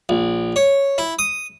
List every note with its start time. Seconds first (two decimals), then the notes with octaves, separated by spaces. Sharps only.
0.09 A#1
0.56 C#5
0.98 E4
1.19 D#6